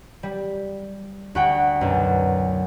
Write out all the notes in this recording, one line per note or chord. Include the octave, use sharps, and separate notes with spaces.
G3
D2 F#4 F#5 G5
B1 F#2